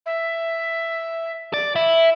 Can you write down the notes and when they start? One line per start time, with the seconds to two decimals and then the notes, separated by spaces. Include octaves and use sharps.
0.06 E5
1.54 D5
1.76 E4